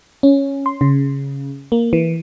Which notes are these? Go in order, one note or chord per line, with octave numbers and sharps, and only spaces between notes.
C#4
C6
C#3
A#3
E3